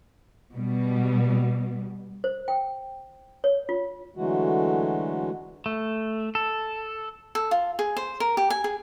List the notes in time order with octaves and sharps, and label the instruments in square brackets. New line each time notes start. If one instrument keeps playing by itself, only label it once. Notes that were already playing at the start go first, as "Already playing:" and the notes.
[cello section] B2 G3
[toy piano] C5
G5
C#5
F4
[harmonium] D3 E3 F#3 G#3 A3 F#4
[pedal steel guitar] A3
A4
[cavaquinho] A4
F4
G#4
C5
A#4
G4
G#5
G#4